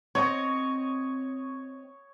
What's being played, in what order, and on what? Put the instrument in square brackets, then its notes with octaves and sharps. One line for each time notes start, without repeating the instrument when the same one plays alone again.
[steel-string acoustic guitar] C4 D#5 [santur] C#5 D#6